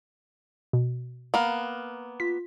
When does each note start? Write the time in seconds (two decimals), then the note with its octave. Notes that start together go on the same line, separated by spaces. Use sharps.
0.73 B2
1.34 A#3 B3
2.20 F4 B6